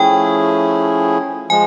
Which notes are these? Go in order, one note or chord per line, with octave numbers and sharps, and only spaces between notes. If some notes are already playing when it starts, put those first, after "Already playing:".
Already playing: F3 A3 C#4 E4 G#4 G5
F3 G#3 G#5